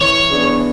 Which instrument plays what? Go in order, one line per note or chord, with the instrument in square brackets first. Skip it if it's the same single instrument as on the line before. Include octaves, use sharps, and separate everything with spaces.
[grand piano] E3 [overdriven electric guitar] C#5
[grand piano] B3 D4 G#4